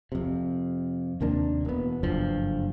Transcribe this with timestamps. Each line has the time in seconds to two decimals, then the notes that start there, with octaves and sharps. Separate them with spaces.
0.12 F2 C3
1.21 D#2 C3 A#3 D4
1.65 E1 B3
2.03 F#1 G2 D3 F3